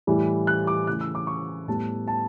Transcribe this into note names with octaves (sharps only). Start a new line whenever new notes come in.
A2 E3 G3
F#6
D6
C#3 E3 A3 F#6
E6
D6
C#6
A2 G3 B3 A5
A5